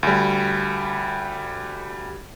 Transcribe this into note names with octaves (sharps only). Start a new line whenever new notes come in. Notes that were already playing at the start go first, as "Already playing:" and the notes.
D2 G3